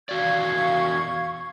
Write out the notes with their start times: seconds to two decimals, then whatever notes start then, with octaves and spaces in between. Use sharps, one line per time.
0.09 E2 F#4 D5 F5 C#6 G#6